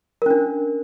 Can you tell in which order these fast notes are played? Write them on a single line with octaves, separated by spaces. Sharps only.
A#4 C#4 D4